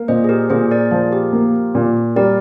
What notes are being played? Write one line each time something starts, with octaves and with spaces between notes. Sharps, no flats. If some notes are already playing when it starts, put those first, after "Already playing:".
Already playing: A#3
A#2 C5 D#5
G#4
G4 A#4
A#2 G#4 C5
A#4 D5
F3 G#4
G4 A#4
A#3
A#2
G3 A#4 D5